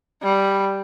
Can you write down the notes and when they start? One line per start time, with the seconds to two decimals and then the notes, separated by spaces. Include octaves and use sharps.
0.23 G3